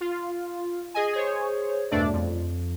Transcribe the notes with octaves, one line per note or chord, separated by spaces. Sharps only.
F4
G#4 D#5 G#5
G#4 C5 C#5
E2 G2 B2 A3 D4 D5
F2